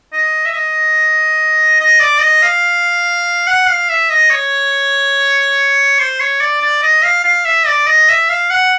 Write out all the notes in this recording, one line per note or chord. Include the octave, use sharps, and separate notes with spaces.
D#5
E5
D#5
D#5
D5
D#5
F5
F#5
F5
E5
D#5
C#5
C5
C#5
D5
D5
D#5
F5
F5
E5
D5
D#5
E5
F5
F#5